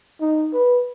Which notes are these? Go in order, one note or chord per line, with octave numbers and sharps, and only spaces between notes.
D#4
B4